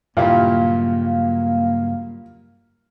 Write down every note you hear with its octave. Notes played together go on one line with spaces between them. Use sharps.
G2 A#2 C#3 F#3 A#3 E4 G4 F5